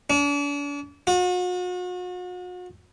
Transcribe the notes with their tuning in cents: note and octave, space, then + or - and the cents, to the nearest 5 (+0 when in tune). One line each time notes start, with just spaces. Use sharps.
D4 -40
F#4 -40